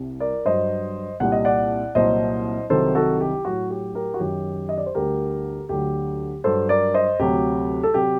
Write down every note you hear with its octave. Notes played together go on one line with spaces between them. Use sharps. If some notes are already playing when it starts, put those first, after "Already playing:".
Already playing: C2 C3 G3
A#4 D5
G2 F#3 C5 D#5
C2 A#2 G3 F#5
D#5
D5 F#5
C2 A#2 F#3 C5 D#5
C2 C3 D#3 F#3 A4 C5
F#4 A4
G4
A2 F#3 F#4
G4
G4 A#4
F#4
F#2 D#3 F#3 G4
D#5
D5
C5
D2 D3 G3 G4 A#4
D2 D3 F#3 G4
G2 F#3 A4 C5
A#4 D5
C5 D#5
D2 C3 F#3 G4
A4
C3 F#3 G4